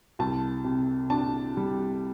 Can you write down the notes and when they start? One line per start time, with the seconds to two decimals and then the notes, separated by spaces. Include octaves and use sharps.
0.19 C2 A5
0.64 C3
1.10 D4 A5
1.57 G3